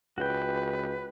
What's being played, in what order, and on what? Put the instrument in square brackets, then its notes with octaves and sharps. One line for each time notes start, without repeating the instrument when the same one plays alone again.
[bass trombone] C#2 [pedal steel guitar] F#4 G5 [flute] B4